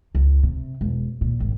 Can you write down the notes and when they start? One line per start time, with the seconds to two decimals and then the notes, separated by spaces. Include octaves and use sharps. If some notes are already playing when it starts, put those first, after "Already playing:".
0.15 C#2
0.43 C3
0.81 E1
1.21 A#2
1.40 G#1